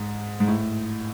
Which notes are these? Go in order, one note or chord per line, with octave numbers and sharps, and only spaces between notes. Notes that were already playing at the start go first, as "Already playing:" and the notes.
Already playing: G#2
G#2
A2